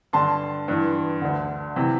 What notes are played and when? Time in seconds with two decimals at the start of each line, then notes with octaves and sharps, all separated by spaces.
0.13 G2 D3 A5 C6
0.68 G2 E3
1.22 D2 D3
1.76 C3 E3